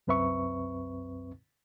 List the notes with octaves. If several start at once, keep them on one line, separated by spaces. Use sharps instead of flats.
C2 F#2 C4 B4 E5 C#6